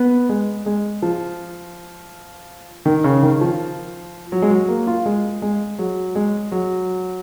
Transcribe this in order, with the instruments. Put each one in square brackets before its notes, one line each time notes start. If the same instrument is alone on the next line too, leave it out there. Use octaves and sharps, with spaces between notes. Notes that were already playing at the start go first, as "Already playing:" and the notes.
Already playing: [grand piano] B3
G#3
G#3
F3
D#3
C#3
D#3
F3
F#3
G#3
F#3
A#3
F4
G#3
G#3
F#3
G#3
F#3